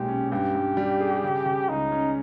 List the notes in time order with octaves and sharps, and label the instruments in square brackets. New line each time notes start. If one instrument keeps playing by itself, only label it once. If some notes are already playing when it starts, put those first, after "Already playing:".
Already playing: [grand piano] B1 A#2 G#3 [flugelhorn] G4
[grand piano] C#4
[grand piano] G2 [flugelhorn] G4
[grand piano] G2
G3
G#4
C#3
C#3
[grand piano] C#2 [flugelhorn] D#4
[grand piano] C#4